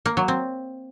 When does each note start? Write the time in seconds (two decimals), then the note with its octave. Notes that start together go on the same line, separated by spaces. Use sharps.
0.06 A#3
0.17 F#3
0.28 C4